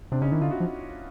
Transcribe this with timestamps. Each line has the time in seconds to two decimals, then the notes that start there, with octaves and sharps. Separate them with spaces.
0.12 C3 C4 D4
0.21 C#3 C#4 D#4
0.31 D#3 D4 E4
0.41 D3 D#4 F4
0.50 E4 F#4
0.60 F3